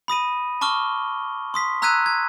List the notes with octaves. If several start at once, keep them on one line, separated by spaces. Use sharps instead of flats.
B5 D#6 A#6 D#7
A5 C#6 D6 F6 G7
C6 D#6 B6
A#5 E6 F#6 G#6 B6 D#7
G#6